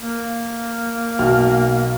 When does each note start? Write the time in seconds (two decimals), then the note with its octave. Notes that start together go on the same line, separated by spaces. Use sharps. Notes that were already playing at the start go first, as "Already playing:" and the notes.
0.01 A#3
1.19 B1 F#4 F6